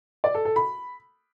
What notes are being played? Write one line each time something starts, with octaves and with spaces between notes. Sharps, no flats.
D5
A4
A4
B5